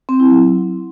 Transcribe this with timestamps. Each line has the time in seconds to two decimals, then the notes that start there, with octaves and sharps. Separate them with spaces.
0.09 C4
0.20 E4
0.31 F#3